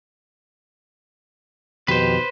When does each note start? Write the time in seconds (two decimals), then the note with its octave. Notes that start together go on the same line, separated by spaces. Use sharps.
1.88 F2 B2 D#3 G4 B4 C5